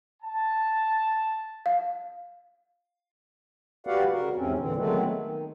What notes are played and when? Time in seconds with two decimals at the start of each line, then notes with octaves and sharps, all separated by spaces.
0.22 A5
1.66 F5
3.87 F#4 G4 B4 D5 F5 F#5
4.11 C#3 F#4 A#4
4.36 E2 G#2 C3 C4 C#4
4.58 A#2 D3 E3 C4
4.76 D#3 F#3 G#3 A3 B3 C4
5.14 D#3